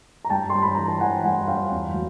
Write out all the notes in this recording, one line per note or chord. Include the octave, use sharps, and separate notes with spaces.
A#5
G2 G5 A5
G2 C6
B5
E3 A#5
A5
E3 F#5 G#5
G2 F#5 G#5
G2 F5 G5
E2
F#3